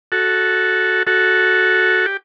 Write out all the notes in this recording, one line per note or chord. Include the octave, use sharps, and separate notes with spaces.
F#4 A4
F#4 A4
G4